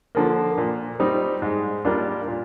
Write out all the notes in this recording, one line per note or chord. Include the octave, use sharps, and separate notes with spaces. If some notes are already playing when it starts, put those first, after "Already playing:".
D3 F3 A#3
A#2
G3 C4 D#4
G#2
G3 A#3 D4 F4
A#2